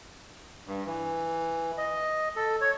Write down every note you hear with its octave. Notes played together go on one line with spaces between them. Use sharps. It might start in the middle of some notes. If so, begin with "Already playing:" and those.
G2
E3
D#5
A4
C#5